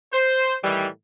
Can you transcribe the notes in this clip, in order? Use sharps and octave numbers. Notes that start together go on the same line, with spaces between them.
C5
A2 D#3 E3 G3